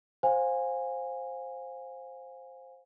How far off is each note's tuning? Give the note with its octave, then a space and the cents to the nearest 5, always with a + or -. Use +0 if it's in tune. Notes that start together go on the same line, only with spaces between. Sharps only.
C5 +10 F5 +25 G#5 -15